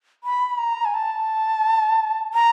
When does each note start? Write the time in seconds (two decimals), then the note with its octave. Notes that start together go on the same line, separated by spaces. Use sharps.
0.24 B5
0.58 A#5
0.85 G#5
0.94 A5
2.34 A#5